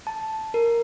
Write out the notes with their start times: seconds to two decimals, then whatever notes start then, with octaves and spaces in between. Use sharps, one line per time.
0.07 A5
0.54 A#4